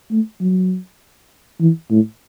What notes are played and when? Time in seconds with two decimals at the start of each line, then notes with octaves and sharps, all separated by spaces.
0.11 A3
0.41 F#3
1.61 E3
1.90 A2